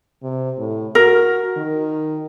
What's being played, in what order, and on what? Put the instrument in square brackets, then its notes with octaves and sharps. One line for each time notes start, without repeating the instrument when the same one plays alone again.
[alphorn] C3
A2
[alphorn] F#4 [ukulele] A#4
[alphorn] D#3